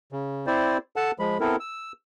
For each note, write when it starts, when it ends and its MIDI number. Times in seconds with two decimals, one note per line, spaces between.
0.12 0.46 49
0.47 0.78 60
0.47 0.78 64
0.47 0.78 72
0.47 0.78 74
0.96 1.11 69
0.96 1.11 78
0.96 1.11 81
1.19 1.38 53
1.19 1.38 56
1.19 1.38 83
1.40 1.56 59
1.40 1.56 60
1.40 1.56 64
1.40 1.56 69
1.40 1.56 70
1.60 1.92 88